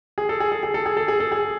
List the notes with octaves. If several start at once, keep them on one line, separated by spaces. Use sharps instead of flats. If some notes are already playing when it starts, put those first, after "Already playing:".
G#4
A4
G#4
A4
G#4
A4
G#4
A4
G#4
A4
G#4